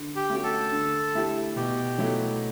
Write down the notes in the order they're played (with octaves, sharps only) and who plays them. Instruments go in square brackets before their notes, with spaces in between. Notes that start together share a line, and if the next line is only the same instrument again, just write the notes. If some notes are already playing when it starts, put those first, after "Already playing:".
Already playing: [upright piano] D3
[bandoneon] G4
[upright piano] A3 C#4 F#4
[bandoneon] A4
[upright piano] D3
A3 E4 G4
[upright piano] B2 [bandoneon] G4
[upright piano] F#3 A3 E4